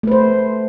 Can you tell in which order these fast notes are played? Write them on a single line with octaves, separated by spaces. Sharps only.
A3 B4 C5